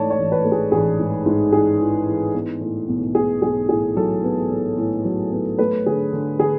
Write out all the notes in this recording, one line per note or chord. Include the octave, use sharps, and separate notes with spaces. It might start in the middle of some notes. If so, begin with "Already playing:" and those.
Already playing: G#2 E3 A3 C#5 D5 A5
C#5
A1
B4
A3
G#4
A1 G#4
G#2
G#2
E3 G#4
E3
E3
B3
A2
B1
B3 G#4
B1 G#4
A2 G#4
F#3 A4
B3
A2
A2
F#3
B3
A3 B4
D3 G#4
D3
D3 G#4